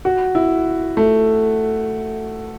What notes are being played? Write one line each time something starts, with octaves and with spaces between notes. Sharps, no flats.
F#4
E4
A3